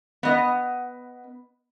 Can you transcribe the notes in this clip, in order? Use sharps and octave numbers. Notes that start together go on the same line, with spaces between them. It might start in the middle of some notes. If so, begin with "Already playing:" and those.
B3 D#5